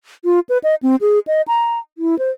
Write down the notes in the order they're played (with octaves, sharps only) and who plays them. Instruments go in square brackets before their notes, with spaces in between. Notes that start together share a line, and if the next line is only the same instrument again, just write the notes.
[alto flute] F4
B4
D#5
C4
G#4
D#5
A#5
E4
C5